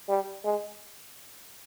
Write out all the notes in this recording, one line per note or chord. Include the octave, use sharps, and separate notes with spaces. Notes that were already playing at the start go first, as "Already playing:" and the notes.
G3
G#3